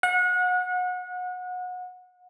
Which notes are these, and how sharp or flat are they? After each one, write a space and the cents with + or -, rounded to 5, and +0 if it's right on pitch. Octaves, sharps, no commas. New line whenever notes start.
F#5 -30